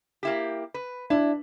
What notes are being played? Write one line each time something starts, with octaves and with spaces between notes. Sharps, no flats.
A#3 E4 G4
B4
D4 E4